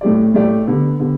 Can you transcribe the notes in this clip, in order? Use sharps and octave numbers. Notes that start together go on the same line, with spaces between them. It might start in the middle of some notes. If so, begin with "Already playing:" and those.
A2 A3 G4 D5
A2 A3 G4 D5
D3 B3 G4
D3 B3 G4